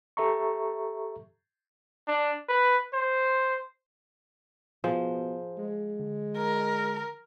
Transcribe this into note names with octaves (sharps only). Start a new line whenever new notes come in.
G4 A4 E5 A#5 C#6
D4
B4
C5
B2 F3 G#4 C5
G#3
D3
A#4